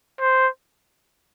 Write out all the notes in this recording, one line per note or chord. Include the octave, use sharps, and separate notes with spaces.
C5